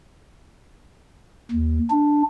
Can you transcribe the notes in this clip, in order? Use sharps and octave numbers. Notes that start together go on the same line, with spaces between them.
D#2
D4